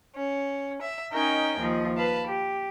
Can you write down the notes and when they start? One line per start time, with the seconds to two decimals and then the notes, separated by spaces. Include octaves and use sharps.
0.14 C#4
0.81 E5
1.13 C#4 D#4 A#4 D#5 G5 G#5
1.59 D#2 F3 D#5
1.97 B4 F5 A5 B5
2.27 G4